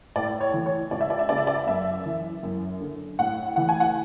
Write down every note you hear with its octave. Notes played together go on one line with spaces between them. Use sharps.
A2 D5
C#5
E3
C#5
C#2 D5
E5
D5
E5
C#3 D5
E5
D5
F#2 E5
E3
F#2
D3
A2 F#5
E3 F#5
G#5
F#5